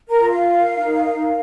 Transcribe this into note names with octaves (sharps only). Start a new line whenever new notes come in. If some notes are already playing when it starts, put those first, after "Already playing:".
A#4 A#5
F4
F5
A#4
D#4
A#4